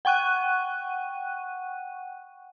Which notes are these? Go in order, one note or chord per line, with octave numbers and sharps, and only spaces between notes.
F#5 G5 C#6 F#6 D#7